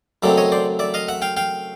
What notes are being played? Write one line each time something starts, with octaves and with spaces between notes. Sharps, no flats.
F#2 C#3 F#3 A3 C4 D5 E5
C#5 D#5
C5 D5
D5 E5
D#5 F5
E5 F#5
F5 G5
F5 G5